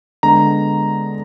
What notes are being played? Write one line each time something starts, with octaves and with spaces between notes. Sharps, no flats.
D3 G#3 B3 A#5